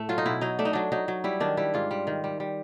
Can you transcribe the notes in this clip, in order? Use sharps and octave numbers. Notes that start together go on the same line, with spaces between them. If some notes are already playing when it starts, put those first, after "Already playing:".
Already playing: A2 A3
F#3 F4
D#4
B2 E4
F#3 D#4
A3 D4
D#4
F#3 D4
F#3 D#4
F#3
G3 E4
D#3 D4
G3 E4
G#2 F4
G3
D#3
G3
G3